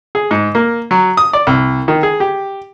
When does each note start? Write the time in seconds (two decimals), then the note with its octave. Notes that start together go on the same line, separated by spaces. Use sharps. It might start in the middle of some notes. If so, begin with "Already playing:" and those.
0.15 G#4
0.31 G#2
0.55 A#3
0.91 F#3
1.17 D#6
1.33 D5
1.47 C2
1.88 D#3
2.03 G#4
2.20 G4